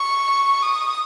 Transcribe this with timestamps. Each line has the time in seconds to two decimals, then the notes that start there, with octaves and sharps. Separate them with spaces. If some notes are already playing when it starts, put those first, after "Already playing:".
Already playing: C#6
0.62 D#6